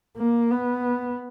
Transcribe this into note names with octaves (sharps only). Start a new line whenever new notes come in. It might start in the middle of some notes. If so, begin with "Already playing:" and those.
A#3
B3